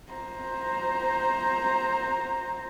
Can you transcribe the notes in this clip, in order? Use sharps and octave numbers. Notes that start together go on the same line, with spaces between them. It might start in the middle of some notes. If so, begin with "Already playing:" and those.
C5 A#5